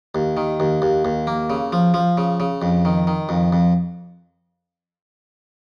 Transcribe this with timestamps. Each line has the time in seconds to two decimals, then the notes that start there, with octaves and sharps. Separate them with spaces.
0.15 D#2
0.37 D#3
0.60 D#2
0.82 D#2
1.05 D#2
1.27 A#3
1.50 C#3
1.72 F3
1.94 F3
2.17 C#3
2.40 C#3
2.62 F2
2.85 D#3
3.07 D#3
3.29 F2
3.53 F2